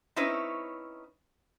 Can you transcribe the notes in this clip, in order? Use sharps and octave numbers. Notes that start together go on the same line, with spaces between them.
C4 C#4 D#4 E4 B4 C#5